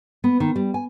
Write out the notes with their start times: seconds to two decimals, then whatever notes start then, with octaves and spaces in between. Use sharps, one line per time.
0.24 B3
0.40 D#3
0.56 G3
0.74 G#5